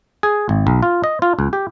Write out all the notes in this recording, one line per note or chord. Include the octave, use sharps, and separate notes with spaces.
G#4
G#1
B1
F4
D#5
F4
C#2
G4